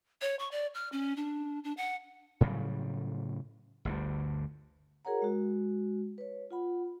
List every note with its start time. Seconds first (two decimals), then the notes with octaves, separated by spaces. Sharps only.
0.22 C#5
0.39 C#6
0.51 D5
0.75 F6
0.92 C#4
1.17 D4
1.64 D4
1.77 F#5
2.41 A2 C#3 F#3 G3
3.85 G1 D2 G2
5.05 F#4 G#4 A#4 C#5 F#5 A#5
5.22 G#3 F#4
6.18 B4 C#5
6.51 F4 F#5 B5